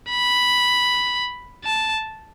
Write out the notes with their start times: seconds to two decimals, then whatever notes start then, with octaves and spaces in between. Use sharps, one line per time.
0.10 B5
1.65 A5